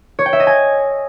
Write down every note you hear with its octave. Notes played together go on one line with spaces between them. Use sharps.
C#5
G5
E5
D#5
G#5